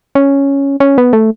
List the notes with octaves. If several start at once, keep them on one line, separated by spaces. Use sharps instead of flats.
C#4
C#4
B3
A3